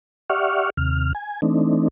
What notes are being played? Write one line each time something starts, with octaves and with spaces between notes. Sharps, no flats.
G4 D5 E5 F#5 C#6 F6
D#2 C3 F6
G#5
E3 A3 C4 D4 D#4